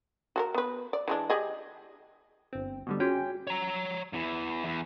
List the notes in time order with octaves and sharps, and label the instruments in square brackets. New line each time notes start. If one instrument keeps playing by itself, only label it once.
[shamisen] F#4 A4 A#4
B3 B4
D5
E3 G#3 D4
G4 G#4 D#5
[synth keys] G1 C4
B2 D3 G3
[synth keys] C#4 G5 [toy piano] F4 F#4 G#4
[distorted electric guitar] C#5 A#5
E2 E3
E2